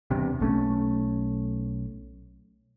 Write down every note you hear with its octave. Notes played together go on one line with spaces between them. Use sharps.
E2 G2 C3
B1 A3 C#4